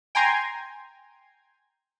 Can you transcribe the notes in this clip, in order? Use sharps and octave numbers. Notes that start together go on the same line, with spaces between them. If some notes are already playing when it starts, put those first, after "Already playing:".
G5 G#5 A#5 C6 G#6